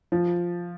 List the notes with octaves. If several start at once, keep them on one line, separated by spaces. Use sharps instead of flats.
F3